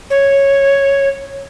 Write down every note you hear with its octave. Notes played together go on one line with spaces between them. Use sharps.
C#5